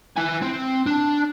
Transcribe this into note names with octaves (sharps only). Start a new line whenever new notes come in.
E4 G#5
C4
D4